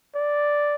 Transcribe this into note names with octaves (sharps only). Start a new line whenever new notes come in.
D5